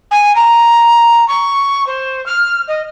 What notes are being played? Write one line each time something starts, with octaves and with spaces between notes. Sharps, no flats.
G#5
A#5
C#6
C5
F6
D#5